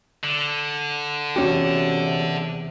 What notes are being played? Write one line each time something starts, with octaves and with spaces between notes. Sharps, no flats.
D3
E2 C3 C#4 F#4 G4